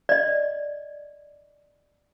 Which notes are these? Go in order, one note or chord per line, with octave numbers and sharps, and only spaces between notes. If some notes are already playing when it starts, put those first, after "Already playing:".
D5 D#5